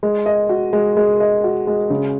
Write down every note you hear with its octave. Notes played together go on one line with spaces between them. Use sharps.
G#3
D#5
F#4
G#3
G#3
D#5
F#4
G#3
C#3